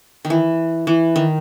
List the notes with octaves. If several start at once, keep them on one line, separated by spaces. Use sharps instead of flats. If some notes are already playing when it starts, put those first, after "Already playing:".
D#3
E3
E3
D#3